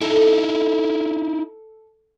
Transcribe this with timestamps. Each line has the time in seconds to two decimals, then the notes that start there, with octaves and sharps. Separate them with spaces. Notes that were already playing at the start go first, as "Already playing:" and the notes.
0.01 D#4 E4 A4